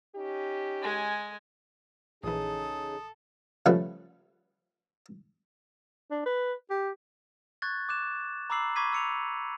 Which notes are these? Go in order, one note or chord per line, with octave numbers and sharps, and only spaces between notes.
C#4 D#4 G4
G#3 G#5
A#1 C#3 E3 D#4 G#4 A4 D#6
C#3 F3 G3 A3 B4
D4
B4
G4
C#6 F#6 G#6 A6
D6 F#6 E7
A#5 B5 D6 E6 C7 F#7
B5 C#6 D6 G#6 B6 D#7
E6 C#7 F7